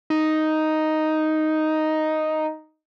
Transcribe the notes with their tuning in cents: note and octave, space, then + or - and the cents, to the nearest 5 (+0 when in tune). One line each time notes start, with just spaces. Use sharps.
D#4 +0